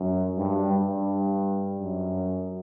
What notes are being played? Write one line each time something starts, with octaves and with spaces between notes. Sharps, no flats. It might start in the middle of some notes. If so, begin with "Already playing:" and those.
Already playing: F#2
G2
G2
F#2